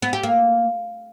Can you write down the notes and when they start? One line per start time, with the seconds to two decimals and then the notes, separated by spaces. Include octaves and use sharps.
0.02 B3
0.13 G4
0.23 A#3